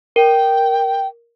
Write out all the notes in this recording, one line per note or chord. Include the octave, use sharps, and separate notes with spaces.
A#4 G5